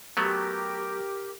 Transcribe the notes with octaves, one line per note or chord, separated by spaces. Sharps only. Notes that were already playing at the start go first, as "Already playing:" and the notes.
F#3 A3 B3 G4 A#4